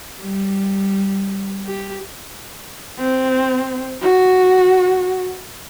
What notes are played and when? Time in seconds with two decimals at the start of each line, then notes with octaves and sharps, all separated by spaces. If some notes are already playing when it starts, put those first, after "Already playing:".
0.21 G3
1.66 G4
2.99 C4
4.02 F#4